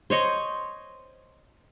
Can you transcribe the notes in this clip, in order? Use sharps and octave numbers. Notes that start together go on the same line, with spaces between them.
C5 C#5 D#5